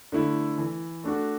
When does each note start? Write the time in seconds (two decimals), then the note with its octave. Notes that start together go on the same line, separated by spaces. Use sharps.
0.12 D3 A3 E4
0.58 E3
1.04 A3 D4 F#4